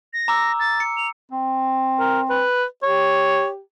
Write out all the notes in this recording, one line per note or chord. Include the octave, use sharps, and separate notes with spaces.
A#6
A#5 D6 E6
A6
C#7
F7
C4
A#4
B4
G4 C#5